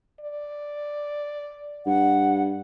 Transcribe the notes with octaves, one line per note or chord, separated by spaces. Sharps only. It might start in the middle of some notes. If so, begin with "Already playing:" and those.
D5
G2 F#5